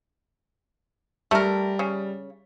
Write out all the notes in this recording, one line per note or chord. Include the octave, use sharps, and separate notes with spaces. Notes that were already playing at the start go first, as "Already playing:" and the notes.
G3 A3 A#4
C#3